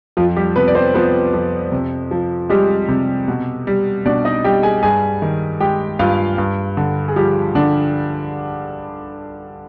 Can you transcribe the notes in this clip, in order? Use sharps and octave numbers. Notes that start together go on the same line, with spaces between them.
F2 F3 F4
G3 G4
C3 B3 B4
D5
C4 C5
F3 B3 B4
F2
C3
F3
G3 G#3 G4
C3
B2
G3
B2 D4 D5
D#4 D#5
G3 G4 G5
G#4 G#5
G2 G#4 G#5
D#3
G#3 G4 G5
G2 F4 F5
G2
D3
G#4
F3 G3 G4
D3 D4